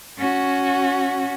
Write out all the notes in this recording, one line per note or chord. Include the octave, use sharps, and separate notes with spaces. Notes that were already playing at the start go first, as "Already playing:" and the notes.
C#4 F#4